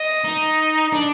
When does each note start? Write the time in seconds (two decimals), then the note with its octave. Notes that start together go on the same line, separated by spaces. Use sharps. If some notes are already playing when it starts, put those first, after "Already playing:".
Already playing: D#5
0.24 D#4
0.93 D4